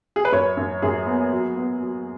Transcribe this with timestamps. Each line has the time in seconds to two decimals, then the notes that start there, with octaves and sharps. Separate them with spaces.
0.16 G#4
0.25 B4
0.32 F#2 C#5
0.57 F#2
0.82 F#2 G#4
1.07 B3
1.32 F#3
1.57 B3
1.82 F#3